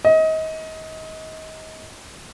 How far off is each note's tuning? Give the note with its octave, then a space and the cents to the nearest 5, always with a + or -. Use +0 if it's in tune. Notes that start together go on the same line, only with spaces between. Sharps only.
D#5 +30